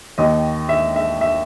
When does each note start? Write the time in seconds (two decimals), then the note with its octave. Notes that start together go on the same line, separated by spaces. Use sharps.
0.18 D#2 D#3 D#5
0.69 E5
0.96 E5
1.21 E5